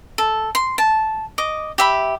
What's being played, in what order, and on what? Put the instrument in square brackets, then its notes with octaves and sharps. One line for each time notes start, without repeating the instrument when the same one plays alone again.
[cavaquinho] A4
C6
A5
D#5 D6
G4 E5 B5